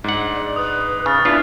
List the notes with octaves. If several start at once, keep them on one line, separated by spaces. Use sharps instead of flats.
G#2 D4 G#4 F#5
D5
B4 D#6
C#3 F6 A6
B3 D4 E4 F4